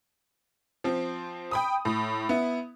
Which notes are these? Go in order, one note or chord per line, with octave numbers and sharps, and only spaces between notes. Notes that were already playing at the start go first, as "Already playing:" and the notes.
F3 C4
G5 B5 D#6
A2
B3 E4